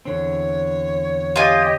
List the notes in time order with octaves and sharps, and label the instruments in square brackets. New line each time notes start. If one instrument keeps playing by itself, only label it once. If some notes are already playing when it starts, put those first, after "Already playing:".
[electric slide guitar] E2 D3 C4 [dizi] C#5
[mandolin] F4 G#5 [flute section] G4 D#5